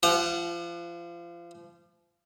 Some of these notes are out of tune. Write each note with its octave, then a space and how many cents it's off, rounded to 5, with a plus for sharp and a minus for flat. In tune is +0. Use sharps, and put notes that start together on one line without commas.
F3 -30 F#5 +0